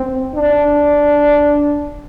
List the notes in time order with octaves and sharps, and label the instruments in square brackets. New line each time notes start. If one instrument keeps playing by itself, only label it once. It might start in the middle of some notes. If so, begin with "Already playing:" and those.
Already playing: [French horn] C4
D4